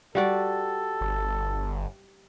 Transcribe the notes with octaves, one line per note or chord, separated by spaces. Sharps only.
G3 F#4 A4 D5
G1